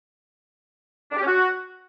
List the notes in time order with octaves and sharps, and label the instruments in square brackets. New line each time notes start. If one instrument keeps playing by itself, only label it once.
[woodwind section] D4
G4
C#4
F#4